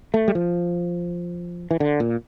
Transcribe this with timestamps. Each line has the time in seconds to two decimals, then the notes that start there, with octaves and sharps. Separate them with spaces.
0.14 A3
0.28 G3
0.35 F3
1.71 E3
1.80 D3
2.00 A#2